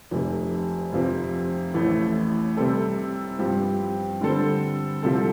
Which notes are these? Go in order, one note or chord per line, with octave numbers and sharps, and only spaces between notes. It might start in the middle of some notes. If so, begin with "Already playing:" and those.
F1 F2 C3
F2 C3 F3 C4
A1 A2 A3
C3 G3 C4 A4
G2 F3 C4 G4
D3 G3 C4 A4 C5
C2 C3 F3 C4 A4